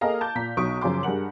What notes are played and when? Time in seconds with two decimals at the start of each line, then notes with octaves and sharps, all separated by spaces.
0.01 A#3 G#4 A4 D#5 F5 A#5
0.21 A5 D6 G6
0.35 A#2 A#5 B6
0.57 B1 F#3 D#4 C#6 D#6 D7
0.81 F#2 C#3 F3 G#4 C6 D6
1.03 G2 G#4 A#4 F#5 F#7